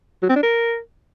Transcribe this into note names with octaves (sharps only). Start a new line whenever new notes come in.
F#3
C4
D4
A#4